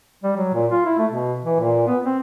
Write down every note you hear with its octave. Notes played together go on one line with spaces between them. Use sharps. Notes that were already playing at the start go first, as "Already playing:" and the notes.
G3
F#3
A#2
F4
E4
A3
B2
E3
A#2
B3
C4